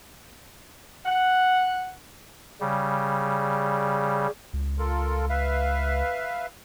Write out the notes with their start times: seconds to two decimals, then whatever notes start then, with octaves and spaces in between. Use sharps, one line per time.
1.06 F#5
2.61 C#3 G3
4.53 C#2
4.79 F4 A4 A#4
5.29 B4 E5 F5